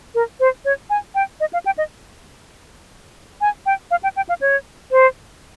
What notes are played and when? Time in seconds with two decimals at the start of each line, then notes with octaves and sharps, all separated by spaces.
0.15 A#4
0.40 C5
0.65 C#5
0.90 G#5
1.15 G5
1.40 D#5
1.53 F5
1.66 G5
1.78 D#5
3.41 G#5
3.66 G5
3.91 F5
4.03 G5
4.16 G5
4.29 F5
4.41 C#5
4.91 C5